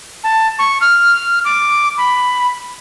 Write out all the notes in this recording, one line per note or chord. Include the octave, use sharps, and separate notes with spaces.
A5
C#6
F6
D6
B5